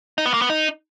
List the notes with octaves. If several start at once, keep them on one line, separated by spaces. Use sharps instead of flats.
D#4
B3
A#3
B3
D#4